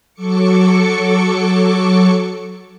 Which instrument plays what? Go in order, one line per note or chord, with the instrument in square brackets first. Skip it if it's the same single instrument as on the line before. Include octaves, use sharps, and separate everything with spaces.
[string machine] F#3 A4 C#6 D6 C#7